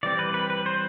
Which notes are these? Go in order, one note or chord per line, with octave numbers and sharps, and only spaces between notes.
E3 G3 C4 D5
B4
B4
B4
C5